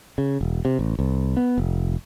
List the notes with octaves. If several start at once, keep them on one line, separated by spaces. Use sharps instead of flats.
C#3
E1
C3
A1
C2
B3
F1